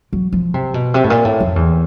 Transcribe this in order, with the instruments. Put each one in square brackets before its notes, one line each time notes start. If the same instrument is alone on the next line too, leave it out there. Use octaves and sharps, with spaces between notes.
[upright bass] F#3
F3
C3
B2
C3
A2
A#2
A2
F2
E2